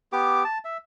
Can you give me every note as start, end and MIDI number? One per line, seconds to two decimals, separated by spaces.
0.13 0.44 59
0.13 0.44 67
0.13 0.44 86
0.44 0.58 81
0.65 0.77 76